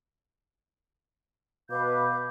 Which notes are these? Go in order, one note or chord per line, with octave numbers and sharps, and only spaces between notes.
B2 B4 F5 D6 G6